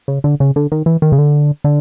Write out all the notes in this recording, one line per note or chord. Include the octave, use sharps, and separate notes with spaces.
C#3
D3
C#3
D3
D#3
E3
D#3
C#3
D3
D3